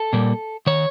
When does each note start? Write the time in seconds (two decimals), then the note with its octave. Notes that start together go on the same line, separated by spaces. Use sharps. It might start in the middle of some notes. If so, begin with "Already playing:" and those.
Already playing: A4
0.13 A#2 G3 A#3
0.67 D#3 C#5